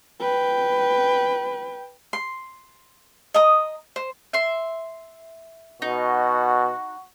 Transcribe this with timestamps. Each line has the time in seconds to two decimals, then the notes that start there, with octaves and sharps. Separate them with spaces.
0.21 B4 G5
2.13 C6
3.34 D#5 A#5 D#6
3.96 C5
4.33 E5 C6
5.82 B2 D#4 F#4